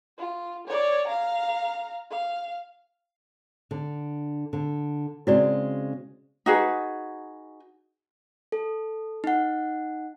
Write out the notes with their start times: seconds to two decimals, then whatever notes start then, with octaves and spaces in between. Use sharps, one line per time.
0.18 F4
0.67 C#5 D5
1.08 F5 A#5
2.11 F5
3.71 D3
4.53 D3
5.27 C#3 G#3 C4 E4 F#4 D5
6.46 D#4 F#4 G#4 B4
8.52 A4
9.24 D#4 F#5